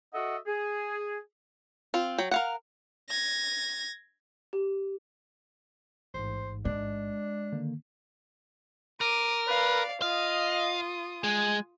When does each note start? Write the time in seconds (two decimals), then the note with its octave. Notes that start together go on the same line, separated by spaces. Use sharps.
0.14 F#4 A4 D#5 E5 F#5
0.47 G#4
1.94 C4 F4
2.18 F#3 G5
2.31 A#4 F5 F#5
3.09 G#6 A#6
4.53 G4
6.14 A1 G#2 C5
6.65 G#3 D4
7.52 D3 D#3 A#3
9.01 A#4 D6 D#7
9.48 B4 D5 F5
10.02 F4 D#5 F5 D#6
11.24 G#3 G#5